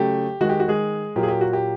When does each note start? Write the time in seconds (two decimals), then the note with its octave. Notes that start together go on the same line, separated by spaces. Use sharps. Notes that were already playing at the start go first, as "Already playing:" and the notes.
Already playing: C#3 F#3 A3 G4
0.41 D#3 G#3 F#4
0.49 G4
0.60 F#4
0.68 G#3 G#4
1.16 A#2 F#3 A#3 G4
1.23 G#4
1.28 G4
1.41 F#4
1.53 G4